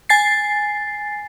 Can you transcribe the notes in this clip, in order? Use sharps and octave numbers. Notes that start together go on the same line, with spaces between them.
G#5 A6 C7